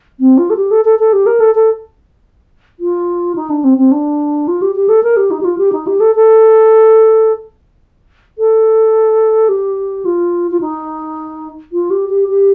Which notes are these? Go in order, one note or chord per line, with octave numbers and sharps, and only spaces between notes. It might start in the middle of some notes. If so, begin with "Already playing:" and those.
C4
F4
A4
G4
A4
A4
A4
G4
A#4
A4
A4
F4
D#4
D4
C4
C4
D4
F4
G4
G4
A4
A#4
G4
D#4
G4
F4
G4
D#4
G4
A4
A4
A4
G4
F4
F4
D#4
F4
G4
G4
G4